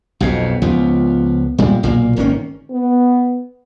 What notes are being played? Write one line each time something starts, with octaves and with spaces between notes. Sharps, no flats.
B1 F2 B2
C#2 F3 B3
A#2 G3 G#3
B1 A#2 A#3
G#1 D#3 A#3 C#4
B3